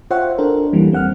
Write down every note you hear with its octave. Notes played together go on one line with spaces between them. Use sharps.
F4 C5 C#5 E5 F#5 G5
D4 A4 A#4
E2 E3 G3 A#3
C4 F#5 F6